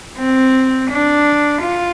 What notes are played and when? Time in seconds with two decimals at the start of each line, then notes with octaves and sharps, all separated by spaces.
0.18 C4
0.90 D4
1.62 F4